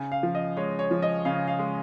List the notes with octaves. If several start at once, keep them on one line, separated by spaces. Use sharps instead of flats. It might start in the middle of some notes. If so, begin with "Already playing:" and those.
Already playing: C#3 G#5
F5
F3
D#5
G#3 C#5
C#5
F3
D#5
C#3 F5
F5
G#3